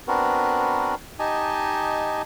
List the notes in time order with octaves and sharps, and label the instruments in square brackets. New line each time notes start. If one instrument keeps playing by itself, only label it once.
[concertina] B3 C4 D4 F#4 A#4 B4
D#4 G4 D#5 G#5 A5